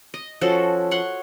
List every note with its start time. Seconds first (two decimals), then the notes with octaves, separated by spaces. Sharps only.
0.14 D#5
0.41 F3 C#4 F#4 A4
0.91 C#5 F#5 C6